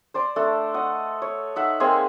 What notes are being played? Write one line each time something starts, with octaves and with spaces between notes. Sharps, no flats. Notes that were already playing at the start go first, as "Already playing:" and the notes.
C5 D5 C6
A3 D4 A4
D#5 F#5
C#5
D#4 E5 F#5
G#3 A#3 C4 G#4